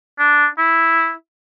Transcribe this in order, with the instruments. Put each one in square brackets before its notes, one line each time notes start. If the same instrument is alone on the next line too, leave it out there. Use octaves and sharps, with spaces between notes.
[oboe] D4
E4